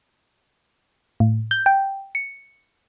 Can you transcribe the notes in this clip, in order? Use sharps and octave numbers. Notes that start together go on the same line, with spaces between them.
A2
G6
G5
C#7